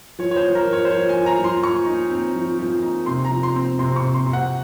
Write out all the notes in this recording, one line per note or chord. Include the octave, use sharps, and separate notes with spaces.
F3 C#5
C#5
C5
F3
A#4
F3
C#5
C5
F3 C#5
G#5
F3
A#5
F3
C6
F3 C#6
D#4
C4
F3
F3
D#4
C3 C6
A#5
F3
C6
C4
C3 C6
C#6
C3
C6
C3
F#5